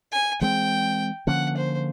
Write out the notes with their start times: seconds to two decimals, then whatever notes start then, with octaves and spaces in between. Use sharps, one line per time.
0.12 G#5
0.41 E3 G#3 C4 G5
1.27 D3 F3 A#3 C#4 F#5
1.57 C5